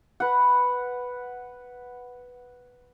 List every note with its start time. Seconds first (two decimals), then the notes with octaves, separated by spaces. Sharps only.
0.20 B4 F#5